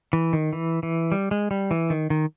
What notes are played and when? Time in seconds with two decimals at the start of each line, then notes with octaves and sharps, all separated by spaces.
0.13 E3
0.33 D#3
0.53 E3
0.83 E3
1.12 G3
1.31 G#3
1.51 G3
1.71 E3
1.90 D#3
2.10 D#3